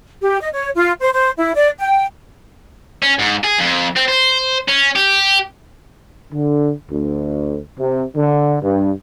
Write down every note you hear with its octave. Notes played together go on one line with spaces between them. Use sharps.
G4
D#5
C#5
F4
C5
C5
E4
D5
G5
C#4
G#2
G#4
F2
C4
C5
C#4
G4
D3
D2
C3
D3
G2